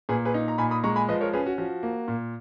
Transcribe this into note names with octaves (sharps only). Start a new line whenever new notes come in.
A#2 G#4 B4
G#4 B4
D#4
A#5
A#2 G#5 B5
B5 D#6
G#3 A#5 C#6
G#5 B5
F3 B4 D#5
A#4 C#5
C#4 G#4 B4
F#4
F3 F#4
A#3
A#2